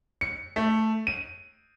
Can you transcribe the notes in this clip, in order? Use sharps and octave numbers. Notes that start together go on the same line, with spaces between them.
C#7
A3
D#7